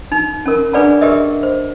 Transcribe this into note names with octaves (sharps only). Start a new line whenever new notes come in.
D#4
C#4 A#4
D4 G#4 B4 D5 F#5 A#5
G4 G#4 A#4 B4 D#5 E5
C5